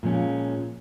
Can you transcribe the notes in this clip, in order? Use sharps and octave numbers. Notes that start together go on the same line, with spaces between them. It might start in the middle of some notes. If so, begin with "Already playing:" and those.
A#2 F3 G#3 C#4